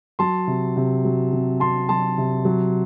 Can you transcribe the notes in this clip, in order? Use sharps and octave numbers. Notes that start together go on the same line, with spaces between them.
F#3 A5 C6
C3
C3
F#3
C3
C3 A5 C6
F#3 A5 C6
C3
F#3